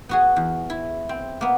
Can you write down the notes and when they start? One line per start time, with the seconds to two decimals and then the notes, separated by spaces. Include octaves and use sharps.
0.09 B3 F#4 G#4
0.36 E2
0.70 E4
1.09 C4
1.41 A#3 B3